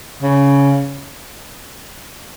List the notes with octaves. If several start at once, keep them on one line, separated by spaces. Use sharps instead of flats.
C#3